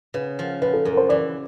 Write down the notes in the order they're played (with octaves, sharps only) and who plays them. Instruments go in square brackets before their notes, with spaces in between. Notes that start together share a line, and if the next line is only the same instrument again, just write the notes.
[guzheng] C#3 [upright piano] B4
[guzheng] F3
[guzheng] F3 [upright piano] B4
[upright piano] A4
[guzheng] F#2 [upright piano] A#4
[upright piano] C5
[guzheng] E3 [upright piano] D5